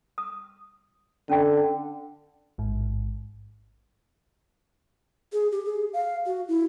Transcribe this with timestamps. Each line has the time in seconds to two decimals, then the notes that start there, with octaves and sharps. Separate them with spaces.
0.18 D#6
1.29 D3 C#4 G5
2.58 A1 G#2
5.33 G#4
5.52 G4
5.65 G#4
5.93 F5
6.26 F#4
6.48 E4